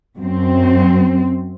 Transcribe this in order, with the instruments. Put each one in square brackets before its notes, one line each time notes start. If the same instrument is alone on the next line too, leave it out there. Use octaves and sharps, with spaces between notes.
[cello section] F#2 C4